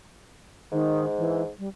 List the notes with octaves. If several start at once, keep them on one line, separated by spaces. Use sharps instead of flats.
G#2 D#3
E3
G3